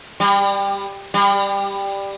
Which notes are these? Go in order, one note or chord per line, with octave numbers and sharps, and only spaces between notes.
G3
G3